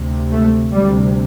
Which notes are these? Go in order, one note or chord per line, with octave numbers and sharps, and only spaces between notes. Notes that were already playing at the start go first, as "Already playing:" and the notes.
Already playing: D2 C3
A3
D2 C3 G3